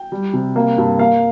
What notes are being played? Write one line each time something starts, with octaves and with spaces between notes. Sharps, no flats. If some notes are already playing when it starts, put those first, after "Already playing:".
Already playing: G5
G3
C3
A#3
G2
A#3 F5